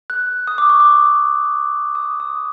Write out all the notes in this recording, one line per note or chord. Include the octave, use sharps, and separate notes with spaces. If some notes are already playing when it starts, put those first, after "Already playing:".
F#6
D#6
D6
C#6
D6
D#6
D#6